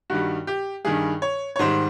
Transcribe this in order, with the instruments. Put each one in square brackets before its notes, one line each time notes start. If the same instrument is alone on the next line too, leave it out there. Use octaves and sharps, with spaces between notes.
[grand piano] G2 D#3 G3 F#4
G4
G2 D#3 G3 G#4
C#5
C#5
G#2 D#3 G3 C5